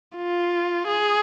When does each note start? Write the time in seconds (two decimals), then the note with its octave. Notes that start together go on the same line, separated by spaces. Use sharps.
0.17 F4
0.87 G#4